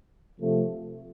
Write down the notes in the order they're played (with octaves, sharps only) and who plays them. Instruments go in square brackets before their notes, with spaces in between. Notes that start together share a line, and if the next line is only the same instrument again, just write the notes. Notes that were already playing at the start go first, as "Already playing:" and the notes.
[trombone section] C3 F3 A3